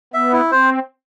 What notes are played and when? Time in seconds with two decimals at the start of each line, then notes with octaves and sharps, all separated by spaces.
0.13 B3 E5
0.33 E4
0.52 C4 C5